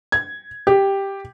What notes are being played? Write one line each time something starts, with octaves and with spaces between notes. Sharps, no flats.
G#6
G4